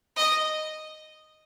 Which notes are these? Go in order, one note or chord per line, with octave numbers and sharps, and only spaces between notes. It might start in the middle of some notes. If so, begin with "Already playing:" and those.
D#5